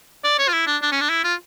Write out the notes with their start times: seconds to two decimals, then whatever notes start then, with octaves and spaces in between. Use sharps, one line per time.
0.24 D5
0.39 C#5
0.48 F4
0.53 E4
0.67 D4
0.82 D4
0.92 C#4
1.01 D4
1.10 E4
1.24 F4